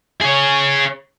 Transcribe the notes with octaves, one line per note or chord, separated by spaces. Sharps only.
G#4 C#5